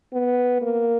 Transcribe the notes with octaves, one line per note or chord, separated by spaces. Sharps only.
B3
A#3